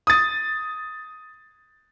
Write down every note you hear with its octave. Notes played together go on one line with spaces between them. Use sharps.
D#6 A6